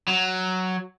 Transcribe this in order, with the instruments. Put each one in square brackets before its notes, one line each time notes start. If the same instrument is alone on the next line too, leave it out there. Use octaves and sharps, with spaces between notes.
[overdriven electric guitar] F#3